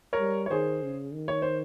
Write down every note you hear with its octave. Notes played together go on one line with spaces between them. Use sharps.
A#4 C#5
G3
C#5
D#3 G#4 C5
C#3
D#3
C#5
C5